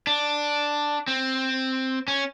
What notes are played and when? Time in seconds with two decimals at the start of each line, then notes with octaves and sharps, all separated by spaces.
0.07 D4
1.08 C4
2.08 C#4